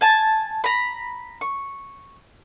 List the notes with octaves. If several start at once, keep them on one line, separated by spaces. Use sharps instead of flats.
G#5 A5
A#5 B5
C#6